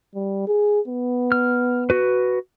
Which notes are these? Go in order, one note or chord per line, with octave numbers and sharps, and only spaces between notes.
G3
G#4
B3
F6
F#4 B4